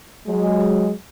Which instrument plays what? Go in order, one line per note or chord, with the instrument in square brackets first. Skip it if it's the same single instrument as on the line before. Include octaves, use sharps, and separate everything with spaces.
[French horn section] F#3 G#3